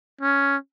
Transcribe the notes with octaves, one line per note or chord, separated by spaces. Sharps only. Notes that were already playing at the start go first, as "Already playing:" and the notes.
C#4